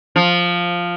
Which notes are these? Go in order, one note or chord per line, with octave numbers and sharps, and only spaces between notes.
F3